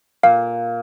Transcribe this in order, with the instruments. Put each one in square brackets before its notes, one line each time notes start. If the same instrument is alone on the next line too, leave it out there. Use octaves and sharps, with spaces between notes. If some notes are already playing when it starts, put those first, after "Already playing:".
[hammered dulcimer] A#2 [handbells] F5